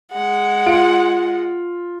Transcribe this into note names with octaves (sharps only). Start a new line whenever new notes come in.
G#3 F#5
F4 D7